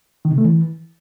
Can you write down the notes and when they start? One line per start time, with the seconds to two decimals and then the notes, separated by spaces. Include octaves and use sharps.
0.25 D#3
0.31 C3
0.38 A3
0.44 E3